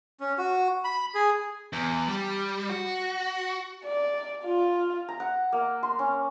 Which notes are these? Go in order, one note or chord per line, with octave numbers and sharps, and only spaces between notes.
C#4
F#4
B5
G#4
E2
G3
F#4
D5
F4
A#5
F#5
A#3
C6
C#4